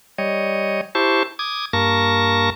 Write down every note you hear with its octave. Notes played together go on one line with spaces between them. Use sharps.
G3 C#5 D#5
E4 G4 C5 A5 C#6
D6 D#6 G#6
G2 A#3 A#4 A5 C#6 A#6